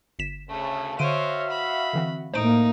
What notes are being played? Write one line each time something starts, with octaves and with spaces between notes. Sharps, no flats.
G1 B6 E7
D2 C#3 A3
D3 F#4 C5 C#5 E5 F5 D7 D#7
B5
D3 E3 C4
A2 A#3 D#4 C5 D7